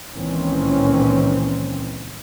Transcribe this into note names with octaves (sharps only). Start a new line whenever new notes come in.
C#2 A#2 D#3 E3 C4 C#4